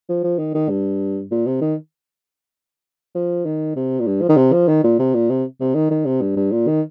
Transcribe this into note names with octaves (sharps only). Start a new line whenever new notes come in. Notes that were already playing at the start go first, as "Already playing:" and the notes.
F3
F3
D#3
D#3
G2
A#2
C3
D#3
F3
D#3
C3
A#2
G2
F3
D#3
C3
F3
D#3
A#2
C3
A#2
C3
C3
D#3
D#3
C3
G2
G2
A#2
D#3